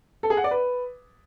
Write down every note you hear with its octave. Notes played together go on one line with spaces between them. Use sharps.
A4
G#4
F#5
D5
B4